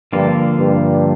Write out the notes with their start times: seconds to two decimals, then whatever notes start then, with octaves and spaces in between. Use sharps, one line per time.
0.13 G2 D3 F3 A#3 F4
0.58 G2